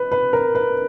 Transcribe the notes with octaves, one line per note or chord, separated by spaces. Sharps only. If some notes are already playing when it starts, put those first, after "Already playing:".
Already playing: B4
B4
A#4
B4